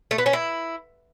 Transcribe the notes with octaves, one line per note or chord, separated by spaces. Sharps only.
A3
B3
C#4
E4